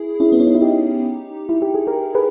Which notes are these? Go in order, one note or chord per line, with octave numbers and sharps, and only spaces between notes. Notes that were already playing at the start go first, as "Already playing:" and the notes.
Already playing: E4 G#4
C#4 E4
B3
C#4
D#4
E4
D#4 G4
E4
G4
G#4
G4 A#4
G#4 B4